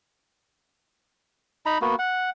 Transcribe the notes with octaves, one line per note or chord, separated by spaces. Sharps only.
D#4 A#5 B5
A#3 B3 F#4
F#5